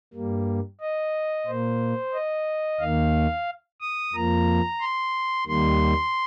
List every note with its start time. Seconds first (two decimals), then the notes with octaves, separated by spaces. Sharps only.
0.14 G2 G3 A#3
0.81 D#5
1.46 A#2 A#3 C5
2.14 D#5
2.80 D#2 D#3 A#3 F5
3.81 D#6
4.14 F2 F3 A#3 A#5
4.80 C6
5.47 D#2 D#3 G3 A#3 C6